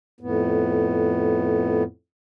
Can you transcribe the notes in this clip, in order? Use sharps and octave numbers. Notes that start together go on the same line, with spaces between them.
F2 A2 B3